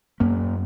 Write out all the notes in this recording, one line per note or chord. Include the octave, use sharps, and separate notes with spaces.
F#2 A#3 C#4